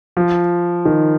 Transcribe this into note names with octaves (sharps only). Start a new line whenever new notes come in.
F3
D#3